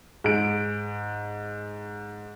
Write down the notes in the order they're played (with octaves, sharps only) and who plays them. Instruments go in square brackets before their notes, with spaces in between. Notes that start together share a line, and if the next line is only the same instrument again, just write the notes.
[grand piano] G#2 D7